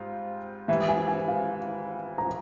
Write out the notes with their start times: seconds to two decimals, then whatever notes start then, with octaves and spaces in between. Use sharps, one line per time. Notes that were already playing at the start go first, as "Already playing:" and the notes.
Already playing: G#2 G3 C4 F4
0.68 G#2 E3 G3 E5
0.88 G#5
1.08 G#5
1.28 F5
2.18 A#5